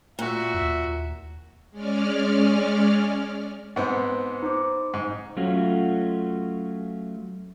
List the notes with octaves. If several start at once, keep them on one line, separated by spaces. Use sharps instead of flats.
A#2 F#4 E5
D#2
G#3 C#4 D5 F6
G#2 B3 C4 F#5
D#4 C5 D6
G#2
F#3 A3 C#4 F4 F#4